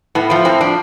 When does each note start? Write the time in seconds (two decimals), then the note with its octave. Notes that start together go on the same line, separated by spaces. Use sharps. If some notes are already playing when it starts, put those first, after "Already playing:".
0.15 A2 B3
0.30 F3 A3
0.45 A2 C4
0.61 F3 D4